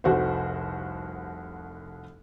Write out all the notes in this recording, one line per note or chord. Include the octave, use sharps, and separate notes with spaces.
F1 C2 F#4 C5